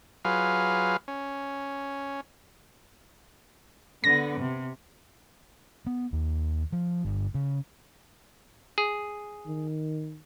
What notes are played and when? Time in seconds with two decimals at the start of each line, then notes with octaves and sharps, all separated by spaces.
0.25 F#3 F4 G#4 B4 F5
1.08 C#4
4.04 D3 B3 A#6
4.40 C3
5.86 B3
6.13 D#2
6.72 F3
7.05 G1
7.35 C#3
8.78 G#4
9.46 D#3